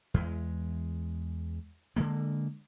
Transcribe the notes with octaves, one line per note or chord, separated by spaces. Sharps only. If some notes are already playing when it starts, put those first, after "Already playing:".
E2 G#3
D3 G#3 A#3